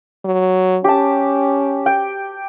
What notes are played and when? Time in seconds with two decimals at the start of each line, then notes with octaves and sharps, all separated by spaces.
0.25 F#3
0.84 C#4 G4 A5
1.86 G5